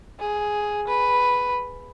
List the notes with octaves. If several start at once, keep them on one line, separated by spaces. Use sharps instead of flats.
G#4
B4